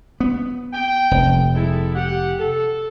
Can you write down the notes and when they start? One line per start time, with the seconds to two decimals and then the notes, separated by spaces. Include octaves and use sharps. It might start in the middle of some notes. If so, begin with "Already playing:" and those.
0.20 B3
0.73 G5
1.11 F1
1.54 G#3 E4 A4
1.95 G4 F#5
2.38 A4